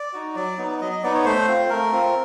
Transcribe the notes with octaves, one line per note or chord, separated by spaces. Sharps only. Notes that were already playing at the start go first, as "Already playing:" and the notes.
Already playing: D5
D#4 F#4
F#3 D5
B3 D#4
F#3 D#5
D#5
B3 D#4 D5
C#5
A3 C5
C4 F4
A3 A#4
C4 F4